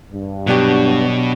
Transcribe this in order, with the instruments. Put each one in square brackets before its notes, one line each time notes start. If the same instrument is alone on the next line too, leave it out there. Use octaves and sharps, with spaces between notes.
[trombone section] G2
[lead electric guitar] B2 [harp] F#3 D4 G4